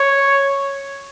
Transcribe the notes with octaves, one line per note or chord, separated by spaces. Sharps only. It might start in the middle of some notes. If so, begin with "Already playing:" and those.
Already playing: C#5